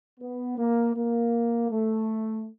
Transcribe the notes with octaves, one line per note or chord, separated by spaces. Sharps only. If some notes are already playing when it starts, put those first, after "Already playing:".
B3
A#3
A#3
A3